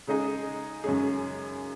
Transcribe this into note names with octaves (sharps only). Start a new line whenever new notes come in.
C#3 G#3 D#4 G#4 D#5
F#2 C#3 G#3 C#4 G#4